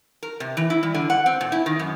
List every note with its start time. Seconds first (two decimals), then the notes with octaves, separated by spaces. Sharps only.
0.23 A#4
0.40 C3
0.57 E3
0.70 E4
0.83 G3
0.95 D3
1.10 F#5
1.26 C4
1.41 A#2
1.52 E4
1.66 D#3
1.79 F#2